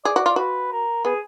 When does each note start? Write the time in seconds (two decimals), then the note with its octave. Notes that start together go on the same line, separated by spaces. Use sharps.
0.05 G#4 D5
0.16 F#4
0.26 F4
0.36 F#4 B4
0.72 A#4
1.05 B3 G#4